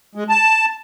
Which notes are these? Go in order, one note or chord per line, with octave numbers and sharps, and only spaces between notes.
G#3
A5